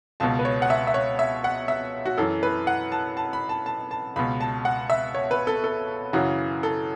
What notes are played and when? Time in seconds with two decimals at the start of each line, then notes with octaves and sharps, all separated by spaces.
0.20 C#2 B2 A5
0.39 B4
0.45 C#5
0.62 F#5
0.70 E5
0.87 E5
0.94 C#5
1.19 E5
1.44 F#5
1.68 E5
2.06 F#4
2.18 F#2 E3 A4
2.43 B4
2.67 F#5
2.92 A5
3.17 A5
3.33 B5
3.49 A5
3.66 A5
3.91 A5
4.16 C#2 B2 B5
4.40 A5
4.65 F#5
4.90 E5
5.15 C#5
5.31 B4
5.47 A4
5.64 A4
6.13 F#2 C#3 E3 F#4
6.63 A4